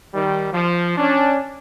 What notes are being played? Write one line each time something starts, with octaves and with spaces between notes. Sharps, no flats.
D#3 G3
F3
C#4 D4